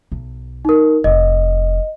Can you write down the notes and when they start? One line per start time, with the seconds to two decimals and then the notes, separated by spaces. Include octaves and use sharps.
0.12 B1
0.65 D#4 A#4
1.04 F1 D#5